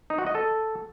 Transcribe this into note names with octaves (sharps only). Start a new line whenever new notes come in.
D#4
F#4
D#5
A4